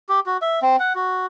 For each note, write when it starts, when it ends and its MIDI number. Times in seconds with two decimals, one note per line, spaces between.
0.09 0.20 67
0.26 0.37 66
0.42 0.59 76
0.62 0.76 60
0.80 0.93 78
0.95 1.26 66